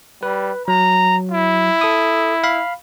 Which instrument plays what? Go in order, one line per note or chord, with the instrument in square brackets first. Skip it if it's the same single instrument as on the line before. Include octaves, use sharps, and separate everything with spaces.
[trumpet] G3 [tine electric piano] B4
[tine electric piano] F#3 [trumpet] A#5
[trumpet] E4
[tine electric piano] A4 D#6
F5 B5